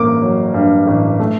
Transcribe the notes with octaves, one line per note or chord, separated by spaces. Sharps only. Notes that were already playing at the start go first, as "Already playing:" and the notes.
Already playing: A1 G2 A#3 D6
F#3
G2
A1
A3